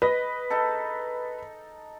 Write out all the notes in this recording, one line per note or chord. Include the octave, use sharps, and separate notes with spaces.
B4 D#5
D#4 A4